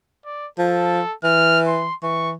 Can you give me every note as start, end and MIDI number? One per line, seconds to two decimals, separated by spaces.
0.25 0.47 74
0.58 1.01 53
0.58 1.14 69
1.24 1.88 52
1.24 1.60 89
1.67 1.95 84
2.03 2.34 52
2.03 2.32 85